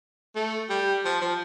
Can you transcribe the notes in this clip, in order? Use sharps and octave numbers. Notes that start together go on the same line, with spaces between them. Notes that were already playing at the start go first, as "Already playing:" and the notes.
A3
G3
F3
F3